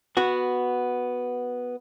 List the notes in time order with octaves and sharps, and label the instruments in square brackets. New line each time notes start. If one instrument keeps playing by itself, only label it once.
[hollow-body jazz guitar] B3 F#4